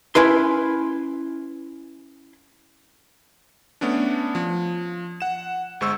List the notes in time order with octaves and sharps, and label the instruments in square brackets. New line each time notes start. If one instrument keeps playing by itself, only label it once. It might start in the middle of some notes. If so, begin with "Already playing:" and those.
[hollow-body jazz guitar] C#4 E4 B4 C6
[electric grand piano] A3 B3 C#4 D4
F3
F#5 E7
G1 G#3 C5 C#6 E6